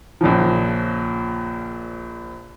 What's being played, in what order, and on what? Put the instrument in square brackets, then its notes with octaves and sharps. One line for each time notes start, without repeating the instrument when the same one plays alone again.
[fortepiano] A#1 A#2 C#3 F3